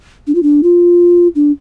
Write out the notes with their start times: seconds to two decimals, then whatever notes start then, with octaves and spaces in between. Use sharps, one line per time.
0.27 D4
0.35 F4
0.43 D4
0.63 F4
1.35 D4